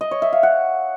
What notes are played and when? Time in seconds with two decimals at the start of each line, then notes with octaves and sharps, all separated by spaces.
0.01 D#5
0.11 C#5
0.22 E5
0.33 F5
0.43 F#5